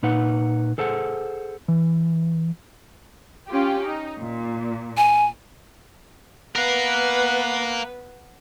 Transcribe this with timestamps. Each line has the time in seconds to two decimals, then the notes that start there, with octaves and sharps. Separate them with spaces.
0.03 A#2 D#4 B4 F#5
0.78 G#4 A4 C5 F#5
1.68 E3
3.48 C#4 F4 G4
3.85 D#4
4.21 A#2
4.97 G#5
6.56 B3 A#4 B4 F5 F#5